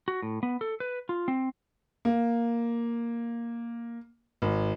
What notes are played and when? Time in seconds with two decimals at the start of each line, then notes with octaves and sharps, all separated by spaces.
0.08 F#4
0.22 A2
0.43 B3
0.61 A4
0.80 B4
1.09 F4
1.28 C4
2.05 A#3
4.42 G#1